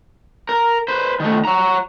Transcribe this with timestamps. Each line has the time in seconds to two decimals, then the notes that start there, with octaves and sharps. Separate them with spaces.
0.49 A#4
0.88 B4 C5
1.20 D#3 A3
1.45 C#5 A#5